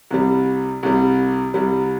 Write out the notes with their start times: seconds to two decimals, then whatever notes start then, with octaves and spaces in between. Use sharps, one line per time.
0.10 C2 C3 G3
0.83 C2 C3 G3
1.54 C2 C3 G3